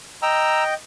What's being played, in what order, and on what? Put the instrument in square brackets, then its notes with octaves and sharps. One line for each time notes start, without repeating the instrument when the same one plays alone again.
[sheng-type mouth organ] D#5 G5 [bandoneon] A#5 E6